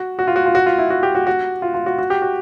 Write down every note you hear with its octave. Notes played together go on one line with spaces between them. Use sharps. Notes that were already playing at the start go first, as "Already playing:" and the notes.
Already playing: F#4
F#4
F4
F#4
F4
F#4
F4
E4
F#4
G4
F#4
F#4
F4
F4
F#4
F#4
G4
F#4